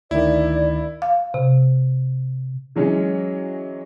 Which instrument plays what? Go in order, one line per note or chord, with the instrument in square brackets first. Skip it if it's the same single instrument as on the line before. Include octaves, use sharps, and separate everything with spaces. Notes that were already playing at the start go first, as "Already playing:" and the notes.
[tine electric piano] D2 D#3 [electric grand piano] E4 [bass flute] D5
[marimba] F5
C3
[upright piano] E3 F#3 G#3 C#4